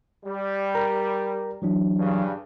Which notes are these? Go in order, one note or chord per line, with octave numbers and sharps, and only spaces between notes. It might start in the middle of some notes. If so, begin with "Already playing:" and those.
G3
A#4 A#5
E3 F#3 D4
G2 C#3